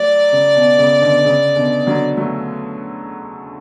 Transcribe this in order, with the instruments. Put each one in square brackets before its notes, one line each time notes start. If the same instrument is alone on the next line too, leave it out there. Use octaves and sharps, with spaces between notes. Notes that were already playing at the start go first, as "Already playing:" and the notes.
Already playing: [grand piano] F#3 A3 [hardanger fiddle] D5
[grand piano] C#3
B2
C#3
B2 D3
C#3
B2 D3
D3 F#3
F#3 A3